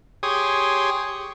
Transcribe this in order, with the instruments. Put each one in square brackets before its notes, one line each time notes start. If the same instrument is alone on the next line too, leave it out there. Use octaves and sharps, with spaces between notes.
[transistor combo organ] G4 G#4 C#5 C6 D#6